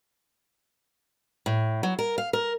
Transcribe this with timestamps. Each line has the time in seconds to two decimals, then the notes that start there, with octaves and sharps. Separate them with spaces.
1.46 A2
1.83 F#3
1.99 A#4
2.18 F5
2.33 A#4